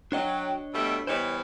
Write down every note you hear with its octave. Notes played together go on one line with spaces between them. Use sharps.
F#3 D4 C#5 D#5 G5
B2 G3 A3 E6
E3 G3 B3 C5 C#5 D#5